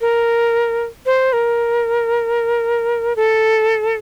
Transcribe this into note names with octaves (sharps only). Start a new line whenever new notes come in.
A#4
C5
A#4
A4